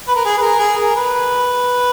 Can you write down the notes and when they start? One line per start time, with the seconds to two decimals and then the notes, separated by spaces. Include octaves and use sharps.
0.08 B4
0.16 A#4
0.25 G#4
0.38 B4
0.42 A#4
0.59 G#4
0.77 A#4
0.96 B4